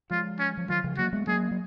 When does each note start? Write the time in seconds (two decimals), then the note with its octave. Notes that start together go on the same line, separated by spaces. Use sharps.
0.10 F3 G#3 F4
0.39 C#4
0.57 F3
0.69 D#3 F#3 F4
0.84 C#3 F3
0.98 F#3 A#3 F#4
1.13 G#3 B3
1.27 F#3 A#3 G#4
1.51 F#3